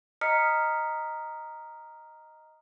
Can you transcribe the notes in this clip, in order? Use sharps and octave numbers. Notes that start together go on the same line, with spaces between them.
D#5 A#5 D#6 F6 B6 C#7